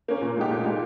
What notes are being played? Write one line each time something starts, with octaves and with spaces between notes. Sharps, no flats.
A#3 C#4
A#2
G#3 D#4 G4
A#2
G#3 D#4 G4